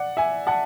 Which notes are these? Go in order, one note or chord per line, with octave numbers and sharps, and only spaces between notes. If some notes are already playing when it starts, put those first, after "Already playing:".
Already playing: D5 F#5
E5 G#5
F#5 A5